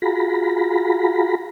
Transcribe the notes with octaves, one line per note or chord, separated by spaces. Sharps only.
F4 F#4 G#4 A#5 B5